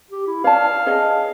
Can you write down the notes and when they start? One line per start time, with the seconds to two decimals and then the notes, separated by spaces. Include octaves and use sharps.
0.11 G4
0.27 E4
0.44 C#5 D5 F5 A5
0.86 G#4 C#5 D#5